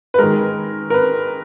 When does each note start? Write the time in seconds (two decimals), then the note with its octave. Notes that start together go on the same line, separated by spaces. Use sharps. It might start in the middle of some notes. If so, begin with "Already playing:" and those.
0.14 B4
0.19 D#3 G#3 A#4
0.90 A#4
0.94 B4